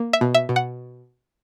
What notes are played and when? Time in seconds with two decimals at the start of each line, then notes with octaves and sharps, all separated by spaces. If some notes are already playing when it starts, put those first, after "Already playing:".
Already playing: A#3
0.13 E5
0.21 B2
0.35 E5
0.49 B2
0.56 F#5